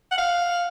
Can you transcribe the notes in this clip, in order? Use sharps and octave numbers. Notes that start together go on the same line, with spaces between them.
F#5
F5